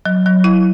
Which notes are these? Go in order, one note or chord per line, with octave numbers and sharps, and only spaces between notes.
F#3
F#3
E4